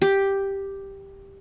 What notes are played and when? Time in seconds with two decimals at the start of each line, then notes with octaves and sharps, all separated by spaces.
0.02 G4